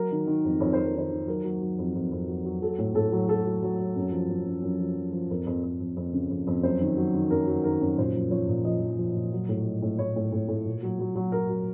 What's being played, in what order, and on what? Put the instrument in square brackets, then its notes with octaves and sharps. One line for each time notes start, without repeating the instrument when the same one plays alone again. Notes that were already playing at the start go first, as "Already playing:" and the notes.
Already playing: [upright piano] F#3 A#4
D#3
D#3
F2
F2 C#5
F2 C5
A#4
D#3 C5
D#3
F#3 A#4
F#3
F#3
F2
F2
F2
F#3
F#3
F#3 A4
A2
A2 A4
F#3
F#3 A4
F#3
F#3
F#3
F#2
F3
F#2
F#2
F#2
F3
F3
F3
F2 A#4
F2
F2
F2
F2
C#3
F2
F2
F#2 C5
D#3
F#3
D#3
F#2 A#4
F#3
D#3 A#4
F#2
A#2 C5
F3
F3 C#5
A#2
F3 D#5
F3
F3
A#2
F#3
A2
F#3
A2
A2 C#5
A2
A2
A2
A#2
F#3
F#3
F#3
F#3 A#4
F#3